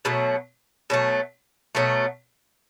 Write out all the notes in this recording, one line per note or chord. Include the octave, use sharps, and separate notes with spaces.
B2 F#3 A3
B2 F#3 A3
B2 F#3 A3